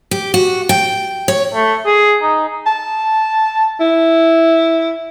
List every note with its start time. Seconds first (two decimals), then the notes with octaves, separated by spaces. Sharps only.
0.11 G4
0.34 F#4
0.69 G5
1.28 C#5
1.54 A3
1.86 G#4
2.22 D#4
2.66 A5
3.80 E4